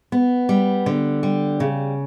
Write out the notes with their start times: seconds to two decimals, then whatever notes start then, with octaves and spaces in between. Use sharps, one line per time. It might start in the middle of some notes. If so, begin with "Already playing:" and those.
0.12 B3
0.49 G3
0.86 D3
1.23 G3
1.60 C#3